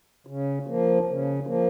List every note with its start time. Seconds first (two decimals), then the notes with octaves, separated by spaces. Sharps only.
0.27 C#3
0.67 F3 A#3
1.08 C#3
1.47 F3 A#3